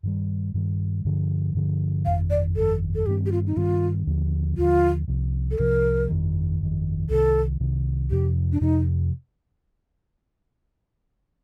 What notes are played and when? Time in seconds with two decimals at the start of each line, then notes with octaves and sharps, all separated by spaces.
0.03 G2 D#3 G3
0.54 G2 D#3 G3
1.05 G2 D3 F3
1.55 G2 D3 F3
2.05 G1 F2 D#3 F5
2.30 D5
2.56 G1 F2 D#3 A4
2.95 A4
3.06 G2 D#3 G3 C4 G4
3.26 G4
3.32 F4
3.47 D#4
3.56 G2 D#3 G3 C4 F4
4.07 D#2 D3 F3
4.57 D#2 D3 F3 F4
5.08 C2 C3 F3
5.51 A4
5.58 C2 C3 F3 A#4
6.09 G1 F2 D#3
6.59 G1 F2 D#3
7.09 C2 C3 D#3 A4
7.60 C2 C3 D#3
8.11 F2 C3 F3 G4
8.52 D4
8.61 F2 C3 F3 D#4